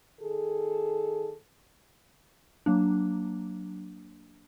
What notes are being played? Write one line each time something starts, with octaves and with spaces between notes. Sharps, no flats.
D#3 G#4 A4
F#3 A#3 D4